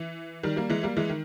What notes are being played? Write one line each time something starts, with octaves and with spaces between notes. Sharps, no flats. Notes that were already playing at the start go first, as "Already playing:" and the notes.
Already playing: E3
D#3 G3
G3 A#3
E3 G#3
G3 A#3
E3 G#3
D#3